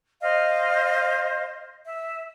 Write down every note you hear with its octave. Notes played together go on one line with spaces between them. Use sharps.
C5 D#5 F5
E5